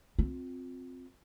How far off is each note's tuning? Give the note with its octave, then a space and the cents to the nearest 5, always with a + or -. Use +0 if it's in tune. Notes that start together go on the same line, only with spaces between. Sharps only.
C4 +0 F4 +35